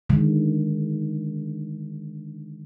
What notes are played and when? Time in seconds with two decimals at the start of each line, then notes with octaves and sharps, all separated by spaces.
0.10 D3 D#3 G#3